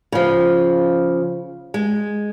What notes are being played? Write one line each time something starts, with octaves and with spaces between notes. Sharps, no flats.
C#3 F3
G#3